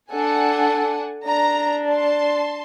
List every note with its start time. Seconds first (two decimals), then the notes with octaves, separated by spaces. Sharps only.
0.12 D4 A4 F#5 G#5
1.26 D4 A#5
1.89 A5 C6